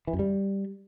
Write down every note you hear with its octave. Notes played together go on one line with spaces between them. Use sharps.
E3
F#2
G3